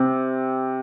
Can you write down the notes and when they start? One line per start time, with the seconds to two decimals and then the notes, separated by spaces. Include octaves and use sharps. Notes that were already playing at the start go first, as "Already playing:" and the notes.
Already playing: C3